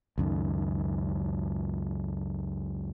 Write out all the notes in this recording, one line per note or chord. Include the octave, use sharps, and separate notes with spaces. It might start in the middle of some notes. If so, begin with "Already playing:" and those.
C#2 F#2 D#3